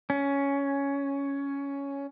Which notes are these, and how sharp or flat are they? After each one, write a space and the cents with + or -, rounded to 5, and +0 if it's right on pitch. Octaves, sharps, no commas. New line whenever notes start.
C#4 +10